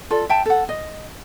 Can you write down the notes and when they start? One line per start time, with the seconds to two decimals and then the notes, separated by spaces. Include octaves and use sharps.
0.10 F4 A4 D5
0.29 E5 G5 A5
0.45 A4 F#5
0.69 D#5